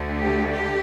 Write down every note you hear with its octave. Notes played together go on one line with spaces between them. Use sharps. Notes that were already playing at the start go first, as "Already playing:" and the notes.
Already playing: D2 D3 A3
G4
G4